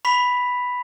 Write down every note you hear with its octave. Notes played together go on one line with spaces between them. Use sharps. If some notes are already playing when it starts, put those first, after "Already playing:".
B5 C#6 B6 F7